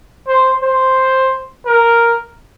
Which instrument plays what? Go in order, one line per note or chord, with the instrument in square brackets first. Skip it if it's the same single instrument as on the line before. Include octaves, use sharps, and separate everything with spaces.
[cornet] C5
C5
A#4